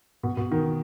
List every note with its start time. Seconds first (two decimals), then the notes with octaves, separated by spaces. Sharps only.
0.23 B2
0.37 B2
0.52 D#3